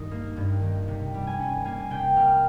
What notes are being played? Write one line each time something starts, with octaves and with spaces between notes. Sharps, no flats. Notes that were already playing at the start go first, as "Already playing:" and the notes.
Already playing: G2 D#3 D#4 A#5
A#3
G2
D#3
C3
G3
G#5
C#4
A#3 G#5
C3 G5
G3 F5